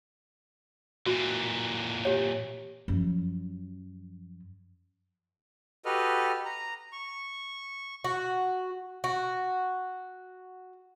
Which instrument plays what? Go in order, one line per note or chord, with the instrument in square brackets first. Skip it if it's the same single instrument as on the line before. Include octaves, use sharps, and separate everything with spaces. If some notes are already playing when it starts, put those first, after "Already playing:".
[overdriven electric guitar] A#2 E3 [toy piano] F#4
[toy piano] G4 C#5
[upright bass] F#2 F3
[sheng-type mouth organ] F#4 G4 A4 B4 D#5 F6
A#5
C#6
[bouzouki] F#4
F#4